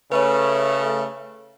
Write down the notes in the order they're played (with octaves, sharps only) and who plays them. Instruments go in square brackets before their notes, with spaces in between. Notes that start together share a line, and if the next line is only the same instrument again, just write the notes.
[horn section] C#3 A3 [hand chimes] B4 C#5